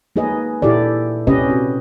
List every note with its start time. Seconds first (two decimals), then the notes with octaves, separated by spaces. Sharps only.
0.16 A#3 D#4 G#4 B4 D#5
0.62 A#2 E4 G4 A4 D5
1.27 C3 C#4 G4 B4 D#5
1.50 F#4